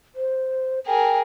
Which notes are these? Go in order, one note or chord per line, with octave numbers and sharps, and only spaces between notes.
C5
G#4 A#4 G5